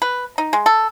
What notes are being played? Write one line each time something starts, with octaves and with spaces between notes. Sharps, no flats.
B4
D#4
G#3
A4